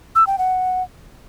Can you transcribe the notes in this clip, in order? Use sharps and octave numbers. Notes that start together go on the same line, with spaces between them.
E6
G5
F#5